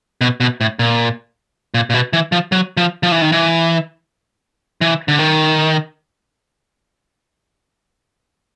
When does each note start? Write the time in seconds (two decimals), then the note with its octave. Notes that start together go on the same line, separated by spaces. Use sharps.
0.21 B2
0.40 B2
0.61 A2
0.79 A#2
1.74 A#2
1.90 A#2
1.94 B2
2.13 E3
2.32 F3
2.52 F#3
2.77 F3
3.03 F3
3.12 E3
3.22 D#3
3.32 E3
4.81 E3
5.08 D3
5.19 D#3